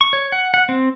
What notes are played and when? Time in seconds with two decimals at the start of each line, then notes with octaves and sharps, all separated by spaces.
0.01 C#6
0.13 C#5
0.32 F#5
0.54 F#5
0.69 C4